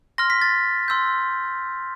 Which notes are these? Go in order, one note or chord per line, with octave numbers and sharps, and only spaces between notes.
C6 F6 A#6
B6
A6
C6 E6 G6